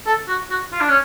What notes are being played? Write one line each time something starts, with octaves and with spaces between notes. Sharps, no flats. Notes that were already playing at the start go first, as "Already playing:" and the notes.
A4
F#4
F#4
F4
D4
C#4